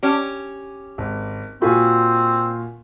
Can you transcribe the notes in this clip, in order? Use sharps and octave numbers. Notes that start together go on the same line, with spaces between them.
C#4 G4
G#1
A#2 C4 F4 F#4 G#5 B5